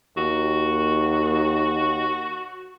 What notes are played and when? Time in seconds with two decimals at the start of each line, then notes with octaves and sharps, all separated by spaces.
0.17 D#2 F#4